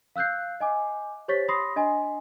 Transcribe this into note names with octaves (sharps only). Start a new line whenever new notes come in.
F5 E6 F#6 G6 C7
D#5 G#5 D6
G4 C5 C#5 C#6 A6 B6
B5 C6 D#6 A#6 C7
D4 D#5 G#5 C6